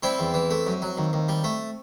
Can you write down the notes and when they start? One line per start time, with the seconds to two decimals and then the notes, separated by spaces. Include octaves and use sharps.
0.03 G3 C4 E4
0.19 E2
0.34 E3
0.50 A3
0.67 F#2
0.82 F#3
0.98 D#2
1.13 D#2
1.28 G3
1.44 A3